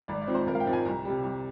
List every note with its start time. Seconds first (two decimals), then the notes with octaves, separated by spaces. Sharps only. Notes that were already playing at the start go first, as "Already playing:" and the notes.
0.08 G#1 D5
0.22 D5
0.27 G#2 F3 C4
0.35 C5
0.47 G#1 A#4
0.55 F5
0.60 G5
0.66 G#2 F3 C4
0.73 G#5
0.85 C2 A#5
1.05 C3 G3
1.23 C2